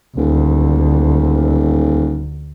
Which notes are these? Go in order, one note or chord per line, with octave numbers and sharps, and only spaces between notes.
D#1 D2